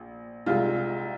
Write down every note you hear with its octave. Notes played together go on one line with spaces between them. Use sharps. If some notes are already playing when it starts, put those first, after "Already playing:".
Already playing: A#1
C2 C3 G#3 F4